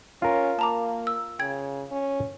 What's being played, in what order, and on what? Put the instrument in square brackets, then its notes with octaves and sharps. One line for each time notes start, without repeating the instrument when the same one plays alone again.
[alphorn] C#4 [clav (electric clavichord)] F4 A#4
[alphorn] A#3 [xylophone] A5 A#5 D6
[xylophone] E6
[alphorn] C#3 [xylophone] G5 G#6
[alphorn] C#4